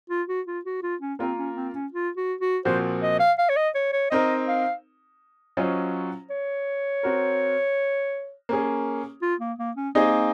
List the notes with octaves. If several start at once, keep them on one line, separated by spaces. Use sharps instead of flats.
F4
F#4
F4
F#4
F4
C#4
A#3 C4 F4 A#4
C#4
C4
C#4
F4
F#4
F#4
A#2 F3 C4 F#4 C5
D#5
F5
F5
C#5
D#5
C#5
C#5
C4 D#4 A#4 D#5
F5
F#3 C#4 F4 C5 D#5
C#5
C4 F#4 A#4
A#3 C#4 G#4
F4
A#3
A#3
C#4
A#3 C4 D#4 G#4 D#5